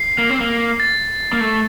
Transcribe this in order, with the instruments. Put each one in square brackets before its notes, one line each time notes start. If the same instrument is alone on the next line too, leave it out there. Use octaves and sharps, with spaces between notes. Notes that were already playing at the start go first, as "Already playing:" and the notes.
Already playing: [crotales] C7
[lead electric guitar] A#3
C4
A#3
[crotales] A6
[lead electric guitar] A#3
A3